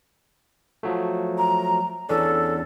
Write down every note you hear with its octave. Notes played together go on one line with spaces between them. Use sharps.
F3 F#3 A3
A#5
E2 C#4 D4 A4